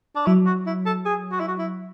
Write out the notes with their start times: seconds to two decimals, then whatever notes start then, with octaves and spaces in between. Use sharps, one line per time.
0.16 D4
0.26 F#3 E4
0.46 F#4
0.67 E4
0.86 A4
1.05 G#4
1.32 F#4
1.40 E4
1.48 F#4
1.59 E4